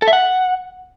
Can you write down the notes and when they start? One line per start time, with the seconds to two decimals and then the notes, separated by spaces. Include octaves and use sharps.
0.02 A4
0.08 E5
0.13 F#5